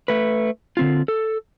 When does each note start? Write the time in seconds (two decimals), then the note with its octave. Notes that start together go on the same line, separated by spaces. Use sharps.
0.08 A3 B4
0.77 D3 C4 F4
1.08 A4